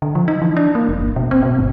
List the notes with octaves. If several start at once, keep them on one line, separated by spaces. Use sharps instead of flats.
D3
F3
D#4
E3
D4
A#3
E1
G1
B2
C4
B2
G1